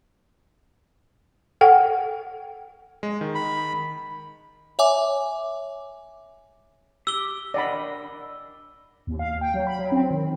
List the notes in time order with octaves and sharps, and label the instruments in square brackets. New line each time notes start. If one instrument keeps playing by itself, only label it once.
[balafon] A4 F#5 G5
[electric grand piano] G#3
D#3
[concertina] B5
[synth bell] C#5 E5 G#5 D6
[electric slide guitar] G4 [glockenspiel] E6 G7
[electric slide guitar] D4 A#4 D#5 [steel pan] D5 F#5 B5
[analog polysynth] D#2
F5
G5
F#3
B5
F#3
C4
D#3